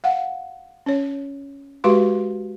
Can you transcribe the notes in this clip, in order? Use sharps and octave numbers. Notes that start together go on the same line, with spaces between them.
F5 F#5
C#4 C#5
G#3 F#4 G4 B4 F5 C6